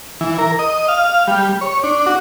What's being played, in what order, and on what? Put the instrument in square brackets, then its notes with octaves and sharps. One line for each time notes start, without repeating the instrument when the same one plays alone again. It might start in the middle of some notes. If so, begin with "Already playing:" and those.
[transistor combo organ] E3
A#4
D#5
F5
G3
C#5
D4
F#4